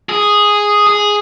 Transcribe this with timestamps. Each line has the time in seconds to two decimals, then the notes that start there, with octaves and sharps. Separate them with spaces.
0.09 G#4
0.87 G#4